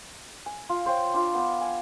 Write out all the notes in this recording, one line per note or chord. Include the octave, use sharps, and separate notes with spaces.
G#5
F4
C5 C#5 F5 G5
D4 F4
B3 D4
G#5